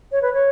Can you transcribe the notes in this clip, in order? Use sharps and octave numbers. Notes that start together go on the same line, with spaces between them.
C#5
B4
C#5